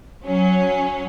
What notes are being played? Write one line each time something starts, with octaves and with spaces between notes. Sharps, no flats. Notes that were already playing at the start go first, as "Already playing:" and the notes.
F#3 C#4